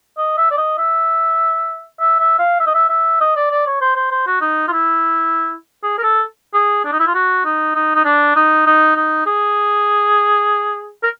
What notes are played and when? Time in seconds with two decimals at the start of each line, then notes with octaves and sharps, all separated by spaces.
0.18 D#5
0.38 E5
0.51 D5
0.58 D#5
0.78 E5
2.00 E5
2.20 E5
2.39 F5
2.60 E5
2.67 D#5
2.75 E5
2.90 E5
3.21 D#5
3.36 D5
3.51 D5
3.67 C#5
3.81 C5
3.96 C5
4.11 C5
4.27 F#4
4.41 D#4
4.68 F4
4.72 E4
5.83 G#4
5.98 A#4
6.04 A4
6.54 G#4
6.85 D4
6.93 D#4
7.00 E4
7.08 F4
7.15 F#4
7.45 D#4
7.76 D#4
7.96 D#4
8.05 D4
8.36 D#4
8.67 D#4
8.96 D#4
9.27 G#4
11.03 A#4